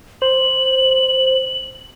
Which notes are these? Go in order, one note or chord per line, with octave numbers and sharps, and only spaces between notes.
C5 F#7